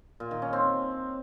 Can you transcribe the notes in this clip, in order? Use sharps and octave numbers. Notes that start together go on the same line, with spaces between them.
A#2
D#3
C#4
C4